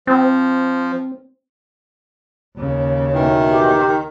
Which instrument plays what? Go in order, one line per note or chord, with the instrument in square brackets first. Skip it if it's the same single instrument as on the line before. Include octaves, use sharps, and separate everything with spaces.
[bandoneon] F3 [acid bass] C4
[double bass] D#2 C#3
[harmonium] B2 E3 [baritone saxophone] D#3
[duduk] G4